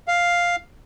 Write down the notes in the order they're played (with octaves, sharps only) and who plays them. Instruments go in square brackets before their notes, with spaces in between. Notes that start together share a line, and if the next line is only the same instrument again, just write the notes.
[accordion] F5